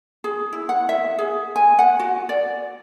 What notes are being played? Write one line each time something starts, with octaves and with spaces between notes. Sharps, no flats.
G#4
E4
F#5
E5
G#4
G#5
F#5
F#4
D5